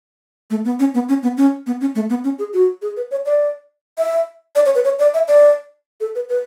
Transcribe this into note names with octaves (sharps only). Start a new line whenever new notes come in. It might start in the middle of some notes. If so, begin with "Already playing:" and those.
A3
B3
C#4
B3
C#4
B3
C#4
B3
C#4
A3
B3
C#4
G#4
F#4
G#4
B4
C#5
D5
E5
D5
C#5
B4
C#5
D5
E5
D5
A4
B4
B4